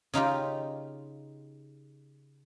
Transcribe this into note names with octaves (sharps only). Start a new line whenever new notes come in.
C#3 D#4 F4 G4